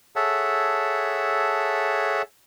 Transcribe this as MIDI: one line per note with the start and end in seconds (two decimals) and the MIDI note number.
0.16 2.22 68
0.16 2.22 69
0.16 2.22 73
0.16 2.22 76
0.16 2.22 78
0.16 2.22 81